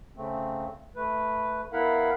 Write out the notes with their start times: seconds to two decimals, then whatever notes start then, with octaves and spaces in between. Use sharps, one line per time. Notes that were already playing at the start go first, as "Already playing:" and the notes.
0.17 C#3 A3 C4
0.96 A3 B4
1.73 B3 E4 A#4 F5 F#5 B5